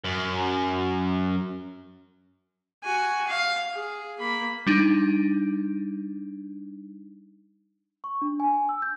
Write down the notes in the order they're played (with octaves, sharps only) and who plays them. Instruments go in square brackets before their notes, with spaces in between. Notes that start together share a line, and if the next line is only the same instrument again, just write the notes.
[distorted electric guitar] F#2
[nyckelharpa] F#4 G#5
F5
G#4
A#3 B5
[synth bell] G3 D4 D#4
[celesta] C#6
D4
G#5
G#5
E6
G6